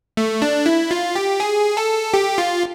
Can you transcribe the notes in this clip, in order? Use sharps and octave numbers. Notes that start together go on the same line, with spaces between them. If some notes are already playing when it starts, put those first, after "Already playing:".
A3
D4
E4
F4
G4
G#4
A4
G4
F4